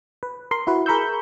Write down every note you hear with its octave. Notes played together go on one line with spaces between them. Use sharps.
B4
A#4 C6
E4 F#4 B4
G#4 A#4 B5 C#6 E6 G6